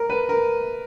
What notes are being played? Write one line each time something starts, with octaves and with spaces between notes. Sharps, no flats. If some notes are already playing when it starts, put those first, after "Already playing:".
Already playing: A#4
B4
A#4